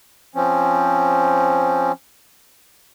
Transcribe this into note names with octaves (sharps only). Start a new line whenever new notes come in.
F3 C4 C#4